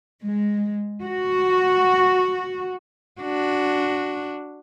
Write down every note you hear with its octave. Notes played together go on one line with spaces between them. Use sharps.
G#3
F#4
D4 F#4